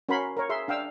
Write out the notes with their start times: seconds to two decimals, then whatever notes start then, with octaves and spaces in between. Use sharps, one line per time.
0.09 C#4 F#4 A#4 C#5 B5 C6
0.37 A#4 C#5
0.49 G#4 E5 C6
0.68 D4 F5 G5 E6